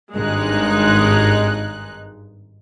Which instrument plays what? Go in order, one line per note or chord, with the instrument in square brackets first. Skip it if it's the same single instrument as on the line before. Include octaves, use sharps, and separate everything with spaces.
[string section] G#1 G2 G#3 D#4 F#6